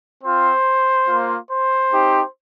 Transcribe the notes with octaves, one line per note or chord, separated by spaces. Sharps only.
C4 F4 C5
A#3 F4
C5
C4 D#4 G4